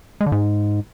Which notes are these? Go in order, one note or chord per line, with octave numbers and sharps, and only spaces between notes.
G#3
D3
G#2